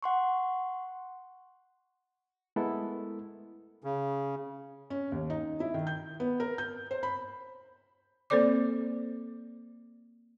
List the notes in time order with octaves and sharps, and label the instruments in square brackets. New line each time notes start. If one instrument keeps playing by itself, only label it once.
[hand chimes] F#5 C6 C#6
[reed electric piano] G#3 A3 B3 E4 A4 A#4
[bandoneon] C#3
[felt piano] C#4
D#2
D#4
E4
D#3
G6
B3
A#4
G6
C5
B5
[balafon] A#3 C4 A4 C5 D5 D6